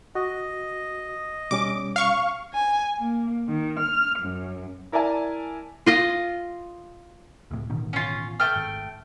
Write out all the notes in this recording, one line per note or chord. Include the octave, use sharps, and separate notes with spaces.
F#4 D#5
B2 G3 C#4 D6
F5 C#6
G#5
A#3
D#3
F6
F#2
E4 A#4 D5 E5 G#5 A5
F4 D#5 F5
C#2 A2
A1 B2 D#3
C#4 F4
A3 G5 F6
G#1